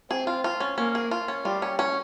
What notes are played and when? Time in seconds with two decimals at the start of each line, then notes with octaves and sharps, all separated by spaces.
0.10 C4 G#4
0.27 F4
0.44 F4
0.60 C#4
0.78 A#3 C#4
0.95 G#4
1.11 F4
1.28 C#4
1.45 G3 F4
1.62 C#4
1.79 C#4